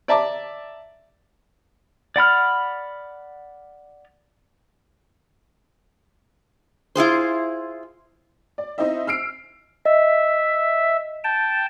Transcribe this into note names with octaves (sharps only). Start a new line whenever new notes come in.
D5 E5 A5 A#5 D6
D5 F#5 B5 F6
E4 F4 G#4 C5
D5
C4 D#4 E4 C5 D#5 E5
E6 F6 C7 D7
D#5 E5
G5 A5